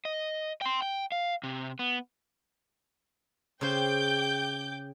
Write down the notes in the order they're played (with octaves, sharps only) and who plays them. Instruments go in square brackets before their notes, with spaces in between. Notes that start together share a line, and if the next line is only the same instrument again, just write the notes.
[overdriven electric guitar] D#5
G5 C6
G5
F5
C3
B3
[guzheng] C#3 C5 [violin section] G5 D6 G6